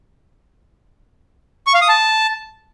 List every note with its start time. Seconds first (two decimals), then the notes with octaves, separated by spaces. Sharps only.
1.67 C#6
1.74 F5
1.81 D#6
1.89 A5